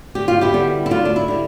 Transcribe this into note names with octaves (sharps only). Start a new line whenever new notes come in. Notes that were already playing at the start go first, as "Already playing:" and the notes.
D2 G4
F4
E4 G4
D3 G3 B3
E4
D2 D4 F4
D4
E4
D3 G3